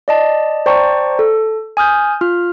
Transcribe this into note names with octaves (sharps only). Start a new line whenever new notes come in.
D5 D#5 A5
C5 D5 G5 A5 A#5 C#6
A4
G#5 D#6 F6 G6
F4 F6